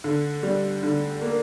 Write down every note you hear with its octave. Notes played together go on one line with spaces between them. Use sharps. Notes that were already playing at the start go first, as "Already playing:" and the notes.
D3
G3
D3
A#3